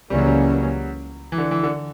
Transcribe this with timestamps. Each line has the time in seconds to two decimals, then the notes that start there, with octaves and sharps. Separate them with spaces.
0.10 C#2 C#3 E3 G3 A#3 C#4
0.18 F#3
0.26 G3
1.32 E3
1.38 D3
1.51 E3
1.64 D3